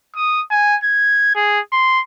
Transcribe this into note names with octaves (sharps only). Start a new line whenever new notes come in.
D#6
G#5
G#6
G#4
C6